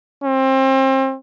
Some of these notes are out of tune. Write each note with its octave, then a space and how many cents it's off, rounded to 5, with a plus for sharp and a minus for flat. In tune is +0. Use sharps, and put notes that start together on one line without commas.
C4 +30